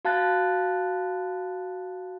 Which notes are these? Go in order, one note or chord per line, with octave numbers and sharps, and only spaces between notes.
F#4 F5 A5 F#6 A6